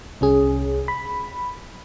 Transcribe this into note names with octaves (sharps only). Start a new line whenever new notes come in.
C2 C#4 G#4
B5